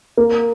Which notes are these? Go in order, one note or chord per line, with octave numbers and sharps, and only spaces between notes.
A#3